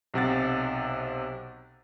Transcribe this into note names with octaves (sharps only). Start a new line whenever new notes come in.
B1 C3 F#5 A6